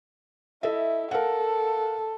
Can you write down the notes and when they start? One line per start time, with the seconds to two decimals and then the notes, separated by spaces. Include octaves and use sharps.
0.63 E4 A4 D#5 E5
1.11 A4 A#4 F5 F#5